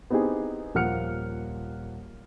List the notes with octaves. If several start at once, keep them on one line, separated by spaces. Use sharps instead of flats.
B3 C4 D#4 E4 G4 G#4
D#1 F3 A#3 F#5 F6 C#7